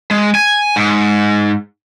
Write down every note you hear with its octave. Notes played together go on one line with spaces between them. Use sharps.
G#3
G#5
G#2